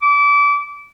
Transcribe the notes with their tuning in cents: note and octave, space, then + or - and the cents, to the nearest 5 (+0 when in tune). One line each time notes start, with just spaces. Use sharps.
D6 -25